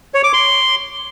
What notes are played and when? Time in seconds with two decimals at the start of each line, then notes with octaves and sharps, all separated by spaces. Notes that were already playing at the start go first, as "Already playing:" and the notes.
0.14 C#5
0.24 D6
0.33 C6